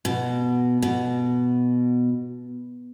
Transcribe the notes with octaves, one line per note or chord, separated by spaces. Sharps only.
B2
B2